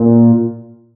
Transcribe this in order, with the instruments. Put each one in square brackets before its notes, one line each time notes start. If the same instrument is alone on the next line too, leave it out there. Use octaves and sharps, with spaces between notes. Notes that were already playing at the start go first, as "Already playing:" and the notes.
Already playing: [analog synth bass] A#2